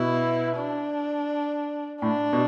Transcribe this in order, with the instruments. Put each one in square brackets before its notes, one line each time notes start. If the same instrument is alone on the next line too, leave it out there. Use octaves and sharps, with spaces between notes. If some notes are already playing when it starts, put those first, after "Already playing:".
Already playing: [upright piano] B2 [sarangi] E4
[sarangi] D4
[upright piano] A2 [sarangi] D4
[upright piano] B2